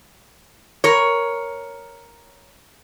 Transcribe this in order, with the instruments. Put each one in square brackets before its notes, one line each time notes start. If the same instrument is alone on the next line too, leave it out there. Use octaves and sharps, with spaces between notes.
[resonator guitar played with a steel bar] A#4 C#5